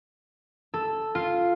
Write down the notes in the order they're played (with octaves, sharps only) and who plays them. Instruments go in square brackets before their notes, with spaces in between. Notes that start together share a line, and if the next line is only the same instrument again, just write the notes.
[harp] A4
F4